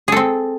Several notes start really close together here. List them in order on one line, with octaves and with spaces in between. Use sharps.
G#4 A4 C4